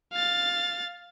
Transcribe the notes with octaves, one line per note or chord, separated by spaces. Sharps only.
F5 A6